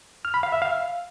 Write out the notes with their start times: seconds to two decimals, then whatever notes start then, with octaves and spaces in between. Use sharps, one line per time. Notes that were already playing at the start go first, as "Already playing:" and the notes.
0.25 F6
0.34 B5
0.43 F5
0.52 E5
0.62 F5